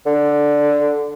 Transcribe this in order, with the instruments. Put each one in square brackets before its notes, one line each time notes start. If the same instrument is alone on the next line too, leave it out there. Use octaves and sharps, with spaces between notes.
[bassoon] D3